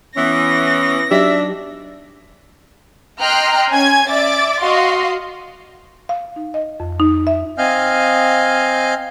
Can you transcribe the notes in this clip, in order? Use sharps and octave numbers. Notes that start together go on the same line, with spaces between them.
E3 B3 C#4 A#6
F#3 D4 D#4 G4 E5
D#5 G5 A#5 C6 F6 F#6
C#4 G#5 G#6
D5 E5 D6 A6
F#4 D#5 F5 C6
F5
D#4
D#5
F2
D#4
E5
C4 D#5 F5 G#5 F6 G6